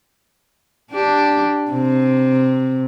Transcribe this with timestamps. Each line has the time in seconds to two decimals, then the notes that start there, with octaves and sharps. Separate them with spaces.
0.92 D4 G4
1.71 C3